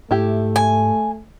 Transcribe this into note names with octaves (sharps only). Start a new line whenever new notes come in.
G#2 A3 E4 G4
G#5